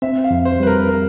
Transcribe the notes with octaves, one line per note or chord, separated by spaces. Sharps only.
C4 E5
F5
F2
C5
G3 B4
A#4
A#4